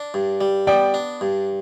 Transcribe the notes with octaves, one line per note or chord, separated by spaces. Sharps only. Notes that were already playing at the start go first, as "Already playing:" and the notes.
Already playing: D4
G2
G3
B3 D5 G5
D4
G2